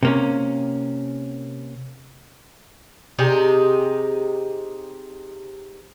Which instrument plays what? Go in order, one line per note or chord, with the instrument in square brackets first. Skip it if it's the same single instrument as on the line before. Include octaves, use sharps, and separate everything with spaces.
[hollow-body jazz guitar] C3 A#3 C#4
[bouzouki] C3 D#4 G4 G#4